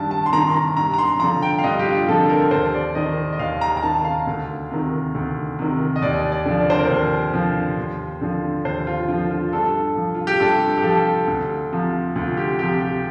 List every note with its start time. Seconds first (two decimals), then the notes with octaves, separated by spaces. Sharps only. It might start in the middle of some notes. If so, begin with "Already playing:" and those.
Already playing: G2 D#3 A5
0.11 A5
0.26 C6
0.33 D#3 A#5
0.54 A#5
0.77 G2 A#5
0.93 A#5
0.98 C6
1.20 D3 F3 A#5
1.42 G5
1.59 F5
1.64 G2 D#5
1.79 G4
1.85 F4
2.08 D3 F3 A4
2.29 A#4
2.51 D#2 C5
2.74 D5
2.95 D#3 D#5
3.33 D#5
3.39 D#2 F5
3.61 A#5
3.77 A#5
3.83 D#3 A5
4.05 F5
4.27 D2
4.71 C3 D#3
5.15 D2
5.59 C3 D#3
5.96 D#5
6.02 D#2 D5
6.32 D5
6.45 D3 F3
6.60 D5
6.70 C5
6.79 A#4
6.87 D#2 C5
7.34 D3 F3
7.77 D#2
8.21 D3 F3
8.65 D#2 C5
8.87 F4
9.08 D3 F3 F4
9.31 F4
9.53 G2 A4
9.96 F3
10.15 F4
10.27 G4
10.40 G2 A4
10.78 G4
10.83 F3 A4
11.27 D2
11.72 C3 F3
12.16 D2 F4
12.37 G4
12.59 C3 F3 G4
12.81 G4